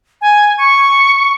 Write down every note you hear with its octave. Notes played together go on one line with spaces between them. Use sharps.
G#5
C#6